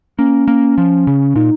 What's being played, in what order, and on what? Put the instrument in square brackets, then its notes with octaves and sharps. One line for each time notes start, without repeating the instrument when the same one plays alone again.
[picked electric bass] A#3 [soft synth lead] C#4
[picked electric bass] A#3
F3
C#3
[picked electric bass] A#2 [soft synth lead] D#4